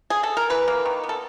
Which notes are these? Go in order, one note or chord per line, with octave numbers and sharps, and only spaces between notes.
G#4
A4
A#4
E3 B4
A#3
D#3
B3
A4